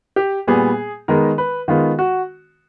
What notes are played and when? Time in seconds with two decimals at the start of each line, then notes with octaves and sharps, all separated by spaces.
0.16 G4
0.47 A#2 G3 B3 G#4
1.08 D#3 G#3 B3 A#4
1.38 B4
1.68 D#3 G#3 B3 F4
1.99 F#4